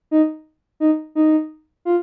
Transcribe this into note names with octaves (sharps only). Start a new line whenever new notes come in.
D#4
D#4
D#4
F4